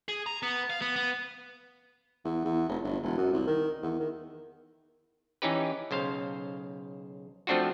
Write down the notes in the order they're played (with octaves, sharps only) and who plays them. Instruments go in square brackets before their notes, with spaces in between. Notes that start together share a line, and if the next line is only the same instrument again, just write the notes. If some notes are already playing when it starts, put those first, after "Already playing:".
[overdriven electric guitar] G#4
A#5
B3
F5
B3
B3
[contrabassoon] E2
E2
F1
G1
E1
F#2
C2
D#3
E2
D#3
[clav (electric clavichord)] E3 C#4 D#4 G4 B4
B1 C#3 C5 F5
F3 A3 C4 D4 F4 F#4